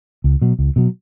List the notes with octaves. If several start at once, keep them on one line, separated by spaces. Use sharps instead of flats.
C#2
B2 F#3
C#2
B2 F#3